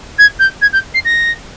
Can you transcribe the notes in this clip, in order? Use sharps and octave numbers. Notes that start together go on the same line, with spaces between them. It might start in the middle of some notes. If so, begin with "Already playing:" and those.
G#6
G6
G#6
G6
C7
A#6